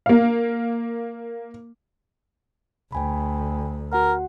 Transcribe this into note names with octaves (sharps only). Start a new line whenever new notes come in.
A#3 F5
D2 G5 G#5 B5
F#4 A#4 F#5